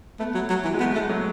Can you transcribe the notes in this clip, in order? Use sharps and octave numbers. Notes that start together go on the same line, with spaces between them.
A3 B3
F#3
F#3
E3
G#3
A3 B3
G#3 A3
F#3